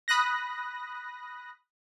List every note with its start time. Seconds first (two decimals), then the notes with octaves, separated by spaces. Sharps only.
0.08 B5 D#6 F#6 A#6